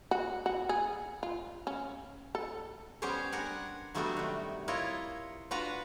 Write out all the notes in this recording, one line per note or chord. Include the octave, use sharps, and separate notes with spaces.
F#4
F#4
G#4
F4
C#4
A4
G3 B3 C#4 G4 C5 C#5
D4 A#4 F#5 G#5
F#3 G3 A3 B3 D4 F#4
C3 D#3
E4 F4 A#4 C#5 D#5
D4 F4 F#4 B4 F#5 A#5